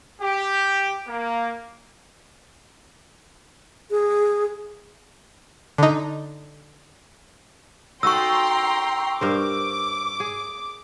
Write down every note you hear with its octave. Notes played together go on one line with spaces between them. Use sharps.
G4
A#3
G#4
D3 D#4
D#4 F#4 A4 G5 A#5 C6 C#6 E6
G2 A#4 C5 D6
G#4